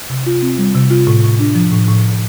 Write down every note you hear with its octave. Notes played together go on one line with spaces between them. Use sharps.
C3
F4
C4
G3
C3
F4
A2
A2
D4
F3
A2
A2